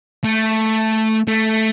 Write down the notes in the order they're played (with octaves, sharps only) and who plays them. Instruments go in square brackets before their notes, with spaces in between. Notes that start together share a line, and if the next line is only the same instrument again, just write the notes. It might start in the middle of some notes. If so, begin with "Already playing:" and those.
[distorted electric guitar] A3
A3